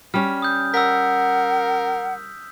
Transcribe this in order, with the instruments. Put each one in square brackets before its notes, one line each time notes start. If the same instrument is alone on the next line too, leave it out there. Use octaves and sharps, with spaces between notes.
[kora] G3 C#4 [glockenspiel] F6
[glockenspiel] D#6 G6
[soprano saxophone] A#4 [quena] F#5 [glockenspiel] E6 B6